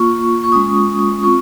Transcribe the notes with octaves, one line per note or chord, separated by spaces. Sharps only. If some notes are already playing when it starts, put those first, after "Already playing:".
Already playing: A#3 F4 C#6
C#6
G#3 C#4 F4 D#6
D#6
D#6
C4 F4 C#6